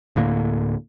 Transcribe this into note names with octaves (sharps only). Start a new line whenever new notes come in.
D1 A2 D3 A#3